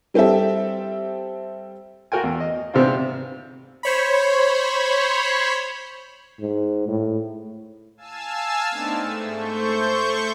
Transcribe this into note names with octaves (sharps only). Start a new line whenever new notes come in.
G3 C4 G4 A4 E5
F4 F#4 A#4 G5 G#5
E2
D#5
G#2 C3 B3 C4 D4 F4
C5 C#5 B5
G#2
A2
F5 G#5 A5 E6
A3 B3 C4 D4 D#4
G#2 A3
A3 C5 C#6 G6